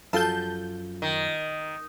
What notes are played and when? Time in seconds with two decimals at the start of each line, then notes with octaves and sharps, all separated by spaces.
0.13 F#2 F3 F4 A4 A5 G6
1.02 D#3